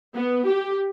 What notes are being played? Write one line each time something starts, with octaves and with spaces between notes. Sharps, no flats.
B3
G4